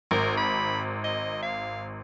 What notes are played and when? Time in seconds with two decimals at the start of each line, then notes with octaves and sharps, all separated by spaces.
0.11 G#1 A#4
0.37 B5
1.04 D#5
1.42 F5